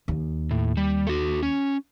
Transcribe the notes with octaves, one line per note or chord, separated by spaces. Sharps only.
D#2
A2
G3
F#4 A4
C#4